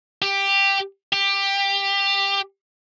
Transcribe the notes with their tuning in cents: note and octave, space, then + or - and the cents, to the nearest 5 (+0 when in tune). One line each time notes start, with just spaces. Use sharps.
G4 +10
G4 +15